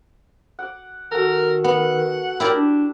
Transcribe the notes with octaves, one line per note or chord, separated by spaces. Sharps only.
F#5 D6
D#3 F#4 A4 A#4
B3 F#4 F#5
E4 G4 A#4 D5
D4